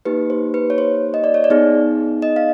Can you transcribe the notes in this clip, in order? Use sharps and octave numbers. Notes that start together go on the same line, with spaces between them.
A#3 D#4 G4 B4
C5
B4
C#5
C5
D#5
D5
C#5
D5
B3 D#4 G#4
D#5
F5